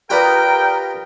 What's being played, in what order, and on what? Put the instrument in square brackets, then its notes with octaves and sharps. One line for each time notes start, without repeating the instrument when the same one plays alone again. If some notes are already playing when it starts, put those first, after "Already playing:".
[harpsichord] F4 B4 A#5 [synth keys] G4 D5 D#6 [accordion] A#4 [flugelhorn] G5